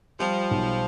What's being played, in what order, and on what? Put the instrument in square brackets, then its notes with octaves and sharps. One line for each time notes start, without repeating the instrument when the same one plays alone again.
[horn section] F3 [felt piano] G3
[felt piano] B1